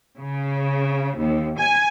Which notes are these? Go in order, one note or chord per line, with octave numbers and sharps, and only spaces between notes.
C#3
D#2
G#5